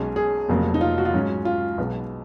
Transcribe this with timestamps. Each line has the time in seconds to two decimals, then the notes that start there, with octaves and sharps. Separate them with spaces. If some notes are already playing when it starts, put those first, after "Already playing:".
Already playing: B1 B2 G#3 C#4
0.16 G#4
0.49 F1 F2 C#3 F#3 A#3
0.74 D#4
0.81 F4
0.98 F#4
1.05 F4
1.14 G#2 F#3 C#4
1.45 F4
1.78 B1 B2 G#3 B3